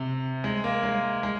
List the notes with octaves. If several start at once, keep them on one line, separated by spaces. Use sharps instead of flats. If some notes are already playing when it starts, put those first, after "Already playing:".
Already playing: C3
G#3
A#3
G#3
G#3